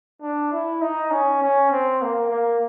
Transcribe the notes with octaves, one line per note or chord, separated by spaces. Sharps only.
D4
E4
D#4
C#4
C#4
C4
A#3
A#3